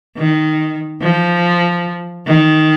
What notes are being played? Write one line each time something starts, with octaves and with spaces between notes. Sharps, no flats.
D#3
F3
D#3